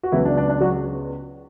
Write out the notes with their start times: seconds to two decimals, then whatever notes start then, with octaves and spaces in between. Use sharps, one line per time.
0.03 F#4
0.12 C#2 C#3 E3 F#3 B3 E4
0.25 D4
0.37 D4
0.50 D4
0.61 F#3 F#4